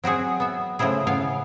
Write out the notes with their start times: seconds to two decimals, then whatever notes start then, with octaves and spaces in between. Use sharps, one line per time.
0.04 F#3 C4 F#4 G#4
0.40 B3 E5
0.79 A2 C#3 F3 E4 G#4
1.07 A2 C#3 B3 F5